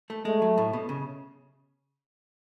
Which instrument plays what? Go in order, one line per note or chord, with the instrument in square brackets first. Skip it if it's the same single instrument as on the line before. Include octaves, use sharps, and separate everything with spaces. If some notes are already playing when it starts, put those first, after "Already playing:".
[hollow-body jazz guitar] A3
[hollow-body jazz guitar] G#3 [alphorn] A3
[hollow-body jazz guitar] F#3
A2
B2
C#3